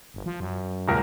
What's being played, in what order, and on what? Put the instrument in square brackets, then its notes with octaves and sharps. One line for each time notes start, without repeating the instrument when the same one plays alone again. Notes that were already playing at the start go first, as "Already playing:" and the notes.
[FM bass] G1
F3
F#2
[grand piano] D#1 C#2 A#4